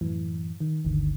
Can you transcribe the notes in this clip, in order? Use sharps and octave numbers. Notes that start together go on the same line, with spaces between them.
F#2 A2 E3
D#3
G1 D2 D3 D#3